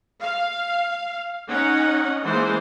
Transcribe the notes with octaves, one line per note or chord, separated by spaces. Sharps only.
F5
C#4 D#4 F#5
E3 G#3 A#3 C5